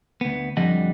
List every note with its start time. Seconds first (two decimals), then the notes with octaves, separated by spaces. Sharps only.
0.21 D2 B3
0.57 F2 D3 F3 G3 D#5 F#5